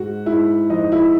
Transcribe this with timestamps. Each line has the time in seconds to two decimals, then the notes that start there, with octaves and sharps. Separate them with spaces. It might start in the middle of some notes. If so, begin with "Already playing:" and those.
Already playing: G#2 F#4
0.26 G#2 E4
0.70 F3 D#4
0.92 E4